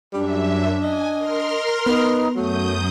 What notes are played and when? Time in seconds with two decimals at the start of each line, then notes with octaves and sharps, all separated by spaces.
0.13 F#2 G3 D4 E5
0.83 D#5 G#5
1.18 A#4 C6 F6
1.86 B3 D#4 B4
2.35 F#2 F#3 A3 D#6 G6